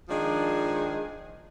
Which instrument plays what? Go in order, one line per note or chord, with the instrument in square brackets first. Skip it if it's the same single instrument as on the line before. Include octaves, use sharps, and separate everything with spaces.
[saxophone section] D#3 F3 G#3 D4 G#4